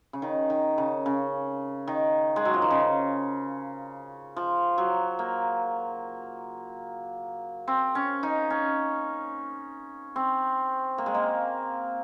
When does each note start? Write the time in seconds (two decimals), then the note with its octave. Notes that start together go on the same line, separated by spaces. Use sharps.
0.13 C#3
0.22 D#3
0.50 D#3
0.78 C#3
1.06 C#3
1.87 D#3
2.36 G#3
2.45 F#3
2.54 F3
2.62 D#3
2.71 C#3
4.36 F3
4.78 F#3
5.19 A#3
7.68 C4
7.95 C#4
8.23 D#4
8.50 C#4
10.16 C4
10.98 A#3
11.06 G#3
11.15 A#3